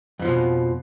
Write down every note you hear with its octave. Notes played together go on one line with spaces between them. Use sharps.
F2 B2 E3 F3